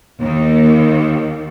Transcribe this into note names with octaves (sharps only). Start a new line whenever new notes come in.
D#2